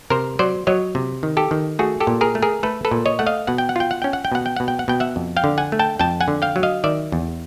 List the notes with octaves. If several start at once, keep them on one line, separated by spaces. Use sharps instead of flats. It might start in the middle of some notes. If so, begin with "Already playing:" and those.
C3 A#4 C5
F#3 C5 D5
F#3 C#5 D#5
C3
D#3
G4 A4
D#3
A3 F#4 G#4
G4 A4
A#2
G#4 A#4
A3
G#4 A#4
A3 A4 B4
A4 B4
A#2
C#5 D#5
A3 F#5
D#5 F5
B2 F#5
G5
F#5
F4 G5
F#5
C#4 G5
F#5
G5
B2 F#5
G5
B2 F#5
G5
F#5
B2 G5
E5 F#5
F2
F5 G5
D3
F#5 G#5
A3
G5 A5
F2 G5 A5
F#5 G#5
D3
F5 G5
F#3
D#5 F5
D#3 D5 E5
E2